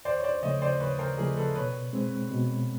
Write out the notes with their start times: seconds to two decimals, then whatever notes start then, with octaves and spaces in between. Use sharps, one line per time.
0.05 D#2 C5 D5
0.18 C#5
0.24 C5 D5
0.43 C#3 F3 A3 C#5 D#5
0.62 C5 D5
0.80 D#2 B4 C#5
0.99 A#4 C5
1.18 C#3 F3 A3 G#4 A#4
1.37 A4 B4
1.55 B2 B4 C#5
1.93 G#3 C4
2.31 B2